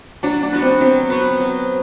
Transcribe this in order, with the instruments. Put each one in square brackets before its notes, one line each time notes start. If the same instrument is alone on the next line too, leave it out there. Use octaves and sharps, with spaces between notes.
[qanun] F#3 [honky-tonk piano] D4
[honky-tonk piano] D4
[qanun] B3 F#4 B4
[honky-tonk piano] C4
[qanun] F#3 [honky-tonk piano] C4
[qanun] B3 F#4 B4
F#3